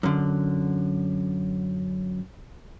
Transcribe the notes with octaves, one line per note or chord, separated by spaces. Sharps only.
F#2 D3